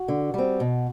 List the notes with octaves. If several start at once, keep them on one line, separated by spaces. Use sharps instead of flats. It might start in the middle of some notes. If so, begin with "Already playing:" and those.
Already playing: F#4
D3
G3 C4
B2